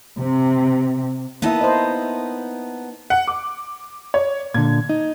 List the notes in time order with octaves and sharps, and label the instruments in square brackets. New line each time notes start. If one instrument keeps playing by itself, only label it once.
[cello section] C3
[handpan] A#3 E4 E5 [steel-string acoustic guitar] B3 D#4 A5
[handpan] C5 D#5
[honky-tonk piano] F#5
D6
C#5
[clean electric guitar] A#2 D3 [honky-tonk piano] G#6
[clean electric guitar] D#4